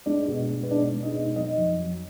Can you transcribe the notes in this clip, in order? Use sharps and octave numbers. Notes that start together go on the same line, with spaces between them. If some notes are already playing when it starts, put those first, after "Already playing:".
G#3 D4 D5
B2
G#3
B4
B2 D4 D5
G#3
D#4 D#5
B2
F#3 D#4 D#5
F2
F#3